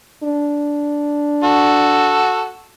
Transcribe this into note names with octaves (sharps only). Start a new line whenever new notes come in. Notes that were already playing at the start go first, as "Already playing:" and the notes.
D4
F#4 A4